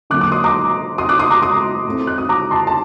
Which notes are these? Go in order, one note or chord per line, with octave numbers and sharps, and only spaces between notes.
D3 F#3 A#3 D6 F#6
D6 F#6
C6 D#6
A#5 D6
C6 D#6
D6 F#6
C6 D#6
A#5 D6
C6 D#6
A2 A3 C4
F#6
D#6
A#5 D6
A5 C6
A5